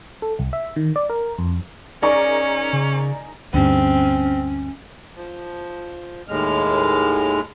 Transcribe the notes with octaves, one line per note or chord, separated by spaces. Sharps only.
A4
C2
E5
D#3
D5
A#4
F2
C#4 D#4 G#4 A#4 D5 C#6
C#3
D2 G2 C4 C#4
F3
D#2 A2 G#3 F6